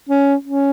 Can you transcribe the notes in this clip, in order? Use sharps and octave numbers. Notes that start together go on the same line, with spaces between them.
C#4
C#4